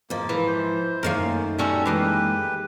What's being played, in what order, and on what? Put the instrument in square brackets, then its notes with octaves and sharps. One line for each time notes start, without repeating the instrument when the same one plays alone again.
[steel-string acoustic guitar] G#2 F3 [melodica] A#3
[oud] E3
[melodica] C5
[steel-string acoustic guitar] F#2 D#3 A3 [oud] A#3 C#4 F5
[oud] G3 C#4 F#4 [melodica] A4
[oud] E3 G#3 A#3 [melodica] G4 B4